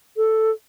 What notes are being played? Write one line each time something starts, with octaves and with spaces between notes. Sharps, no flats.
A4